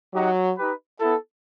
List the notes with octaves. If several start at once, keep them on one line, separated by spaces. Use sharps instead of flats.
F#3 D#4 G4 D#5 F#5
D#4 G4 B4
B3 E4 A4